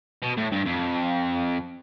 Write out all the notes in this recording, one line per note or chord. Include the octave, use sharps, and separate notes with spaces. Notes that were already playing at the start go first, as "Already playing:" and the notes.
B2
A2
G2
F2